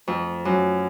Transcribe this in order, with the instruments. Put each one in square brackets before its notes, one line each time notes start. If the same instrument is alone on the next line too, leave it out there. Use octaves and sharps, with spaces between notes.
[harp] F2
F#2